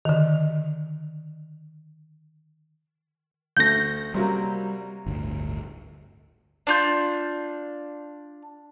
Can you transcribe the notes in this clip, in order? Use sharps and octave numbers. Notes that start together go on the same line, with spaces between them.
D3 D#3
D2 A3 G6 A#6
C3 F#3 G3 A#3
G1 D2 A2
D4 F4 G6